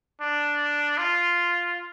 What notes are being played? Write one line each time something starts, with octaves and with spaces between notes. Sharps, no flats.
D4
F4